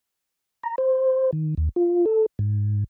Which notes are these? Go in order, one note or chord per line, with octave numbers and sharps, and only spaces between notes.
A#5
C5
D#3
D#2
F4
A4
G#2